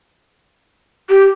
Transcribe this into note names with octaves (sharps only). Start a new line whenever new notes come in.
G4